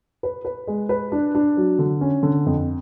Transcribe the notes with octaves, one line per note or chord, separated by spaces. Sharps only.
B4
B4
G#3
B4
D4
D4
F#3
D3
C#4
D3
F2